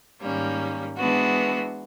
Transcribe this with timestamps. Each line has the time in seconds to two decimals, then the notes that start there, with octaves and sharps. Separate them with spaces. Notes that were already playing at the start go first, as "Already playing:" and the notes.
0.21 G#2 D#3 G3 A#3 C#4
0.96 E3 G#3 B3 D4 F#4